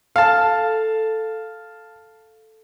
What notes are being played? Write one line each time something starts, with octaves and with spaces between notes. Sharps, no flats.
A4 F5 A5